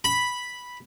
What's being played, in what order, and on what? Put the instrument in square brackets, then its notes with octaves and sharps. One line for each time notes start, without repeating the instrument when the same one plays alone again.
[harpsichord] B5